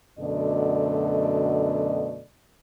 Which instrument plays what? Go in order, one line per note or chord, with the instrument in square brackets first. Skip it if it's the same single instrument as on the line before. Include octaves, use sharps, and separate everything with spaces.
[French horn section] F#2 B2 D3 A3 D5 D#5